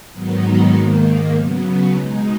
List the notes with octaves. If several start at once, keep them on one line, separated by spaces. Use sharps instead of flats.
G#2 D#3 F#3 B3 D#4
G#2 D#3 A#3
C#3 F#3 B3
B2 G#3 D#4